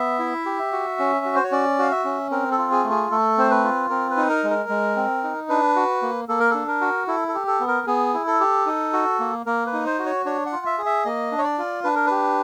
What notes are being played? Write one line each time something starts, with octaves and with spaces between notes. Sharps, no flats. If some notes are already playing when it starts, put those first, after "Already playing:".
Already playing: B3 E5
E4
G4
F#4
C#4
F#4
C5
C#5
C#4 D5
F#4 F5
E5
C#4
C4 A#4
A4
F4
G#4
A3
G#4
A3 A4
C4 C5
B4
F4
C4 A#4
B4
D#4
A#4
G#3
A#4
G#3
C4
D#4
D4 B4
F#4
A#3
A#3 A4
A#4
D4 A4
A#4
F#4
E4 A4
A4
G4
A4
B3
A#4
B3 G#4
E4
A4
G4
D#4
F#4
A#3
A#3 A#4
B4
D#4
C5
F#4
C#5
D4 C#5
F#5
F4
E5
G#4
E5
A#3 D#5
D4
C#5
D5
F4
D4 B4
A#4
G4 B4